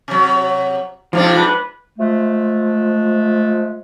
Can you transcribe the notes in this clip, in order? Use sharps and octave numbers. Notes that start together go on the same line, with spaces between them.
C3 F#3
G#2 C3 F3 D4
B4
F3 G#3 A3